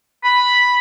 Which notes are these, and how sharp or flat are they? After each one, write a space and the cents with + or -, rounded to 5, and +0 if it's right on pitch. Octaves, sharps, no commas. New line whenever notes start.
B5 +0